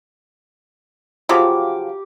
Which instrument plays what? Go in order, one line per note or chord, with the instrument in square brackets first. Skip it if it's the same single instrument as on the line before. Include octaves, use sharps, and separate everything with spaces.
[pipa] C#3 F3 F#3 [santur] G4 D6